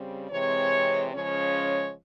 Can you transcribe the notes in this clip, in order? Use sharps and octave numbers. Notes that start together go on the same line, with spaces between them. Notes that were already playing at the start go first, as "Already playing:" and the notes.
Already playing: C#3 G3 C4
C3 E3 G#3 C4 C#5
C#3 F3 G#3 C#4 C#5